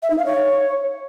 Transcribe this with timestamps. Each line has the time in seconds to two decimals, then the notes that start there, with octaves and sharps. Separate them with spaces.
0.03 E5
0.10 D#4
0.18 F5
0.26 C#5